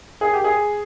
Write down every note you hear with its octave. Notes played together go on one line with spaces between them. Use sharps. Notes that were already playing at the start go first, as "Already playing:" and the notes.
G#4
G4
G#4